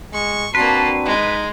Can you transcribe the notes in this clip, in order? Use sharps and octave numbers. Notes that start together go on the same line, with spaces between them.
G#3 C#6
A#3 C4 D4 F#4 B4 A5 C6
G#3 D#4